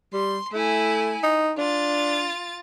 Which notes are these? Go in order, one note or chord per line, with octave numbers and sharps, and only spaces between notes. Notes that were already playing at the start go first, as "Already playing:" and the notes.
G3 C6
A3 E4 G#5
D#4
D4 F4 A6